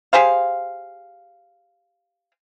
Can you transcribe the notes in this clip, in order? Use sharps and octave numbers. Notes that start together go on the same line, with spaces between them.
G4 G#4 C5 F5